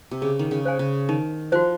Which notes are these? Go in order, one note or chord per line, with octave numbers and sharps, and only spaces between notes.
C3
C#3 G#4
D#3
C#3
C5 F5 G#5
C#3
D#3 D#4
F3 F#4 C5